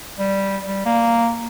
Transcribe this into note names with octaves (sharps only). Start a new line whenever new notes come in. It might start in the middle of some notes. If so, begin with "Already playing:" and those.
G3
G3
A#3